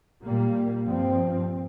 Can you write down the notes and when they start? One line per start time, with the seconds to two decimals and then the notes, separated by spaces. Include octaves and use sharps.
0.24 A#2 G3 A#3
0.85 G2 F3 C4